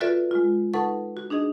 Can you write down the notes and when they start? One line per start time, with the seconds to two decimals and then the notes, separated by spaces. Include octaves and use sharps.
0.01 F4 F#4 A4 B4 D5 E5
0.31 G#3 F4
0.74 D#4 A4 B4 F#5 A5 C#6
1.17 F#4
1.30 D4 D#4 G#4 D#5